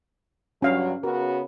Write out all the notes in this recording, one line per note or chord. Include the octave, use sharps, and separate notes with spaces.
G2 F#3 C#4 F5
C#3 B3 F#4 A#4